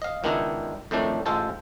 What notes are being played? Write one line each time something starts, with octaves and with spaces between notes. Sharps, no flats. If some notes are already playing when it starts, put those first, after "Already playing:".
D#5 F5
C#2 D#3 B3 D4 E4 D#5
F2 A2 D#3 A3 D4
A1 G#3 F4 A4 C5 A5